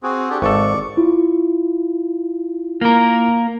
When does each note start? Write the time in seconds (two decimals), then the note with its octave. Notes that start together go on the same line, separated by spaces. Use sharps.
0.03 C4 F#4 G#4
0.30 D4 G4 A4
0.42 G#1 A4 D5 C#6
0.97 E4 F4
2.81 A#3 A#4